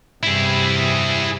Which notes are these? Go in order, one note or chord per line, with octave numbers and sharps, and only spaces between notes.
G2 C3 E4 G#4